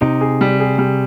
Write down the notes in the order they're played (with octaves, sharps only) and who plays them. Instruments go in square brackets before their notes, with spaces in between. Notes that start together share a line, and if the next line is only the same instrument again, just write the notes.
[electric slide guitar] C3 [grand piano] D#4
[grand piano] G#4
G3
G#4
G3